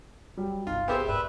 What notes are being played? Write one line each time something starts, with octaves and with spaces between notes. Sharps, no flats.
F#3 G3
F#2
G1 C2 D#4 F4
B3 G4 G#4 A#4 C5 E5 G5
G#2 B4 D5 E5